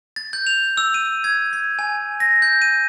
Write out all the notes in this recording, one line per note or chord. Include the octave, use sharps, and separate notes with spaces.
A6
G6
F7
E6
D#7
G#6
G#6
G#5
A#6
G6
D#7